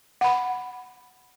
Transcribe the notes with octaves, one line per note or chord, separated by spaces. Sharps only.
F#5 B5